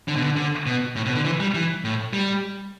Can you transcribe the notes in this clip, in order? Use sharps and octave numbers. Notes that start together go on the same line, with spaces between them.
D3
B2
D3
D3
B2
A2
B2
D3
E3
G3
E3
A2
G3